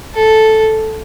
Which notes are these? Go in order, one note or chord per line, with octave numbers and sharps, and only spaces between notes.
A4